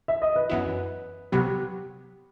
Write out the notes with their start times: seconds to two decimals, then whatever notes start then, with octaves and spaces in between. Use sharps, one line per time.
0.08 E5
0.22 D#5
0.36 B4
0.50 F#2 E3 B3 E4
1.32 C3 F#3 B3 G4